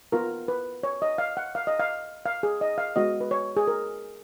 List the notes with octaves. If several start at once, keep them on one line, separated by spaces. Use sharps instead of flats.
B3 F4 A#4
B4
C#5
D#5
F5
F#5
F5
D#5
F5
F5
G#4
D#5
F5
G#3 B3 F#4 D#5
B4
C#5
G#4
A#4